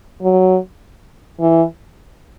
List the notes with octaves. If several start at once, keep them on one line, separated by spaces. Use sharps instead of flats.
F#3
E3